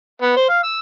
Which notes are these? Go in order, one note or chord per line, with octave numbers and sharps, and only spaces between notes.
B3
C5
F5
E6